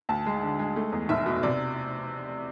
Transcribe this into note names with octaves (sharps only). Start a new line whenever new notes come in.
D2 A5
G#3
D3
G#3
A3
E2
F1 E5
B2
C3 D5